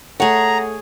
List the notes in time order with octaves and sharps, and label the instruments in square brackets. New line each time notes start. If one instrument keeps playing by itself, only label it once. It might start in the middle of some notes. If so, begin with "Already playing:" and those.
[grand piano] A3 [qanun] G#4 C#5 [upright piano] F#5 [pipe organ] A#5